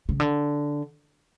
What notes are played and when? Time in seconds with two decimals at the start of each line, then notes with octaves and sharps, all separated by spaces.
0.09 C#3
0.20 D3